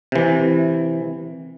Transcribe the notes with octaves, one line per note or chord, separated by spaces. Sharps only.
C3 E3